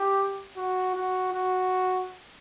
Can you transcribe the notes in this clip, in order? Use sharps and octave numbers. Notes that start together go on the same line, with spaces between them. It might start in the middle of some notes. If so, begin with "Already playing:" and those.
Already playing: G4
F#4
F#4
F#4